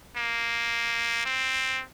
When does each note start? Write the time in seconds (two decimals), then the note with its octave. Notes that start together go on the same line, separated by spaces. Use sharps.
0.17 A#3
1.25 C4